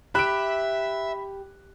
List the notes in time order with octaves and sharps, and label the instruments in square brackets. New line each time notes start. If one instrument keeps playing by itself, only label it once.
[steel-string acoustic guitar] G4 [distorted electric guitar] E5 [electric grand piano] B5 [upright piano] F#6 D7